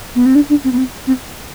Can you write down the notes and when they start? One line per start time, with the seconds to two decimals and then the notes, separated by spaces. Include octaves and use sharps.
0.15 B3
0.26 C4
0.35 D4
0.49 D4
0.64 C4
0.72 B3
0.78 C4
1.07 C4